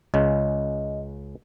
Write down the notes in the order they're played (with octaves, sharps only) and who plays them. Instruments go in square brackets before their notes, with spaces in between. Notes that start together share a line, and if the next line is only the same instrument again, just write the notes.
[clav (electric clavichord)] C#2 C#3 [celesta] D#5